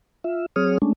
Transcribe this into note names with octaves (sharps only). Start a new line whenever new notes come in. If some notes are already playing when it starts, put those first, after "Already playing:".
F4 E5
F#3 C4 G#4 C#5 D#6 F6
G#3 A3 C#4 D4